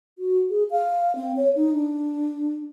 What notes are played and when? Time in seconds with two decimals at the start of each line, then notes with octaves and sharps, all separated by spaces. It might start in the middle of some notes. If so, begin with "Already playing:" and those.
0.18 F#4
0.50 G#4
0.71 F5
1.16 C4
1.36 C#5
1.56 D#4
1.74 D4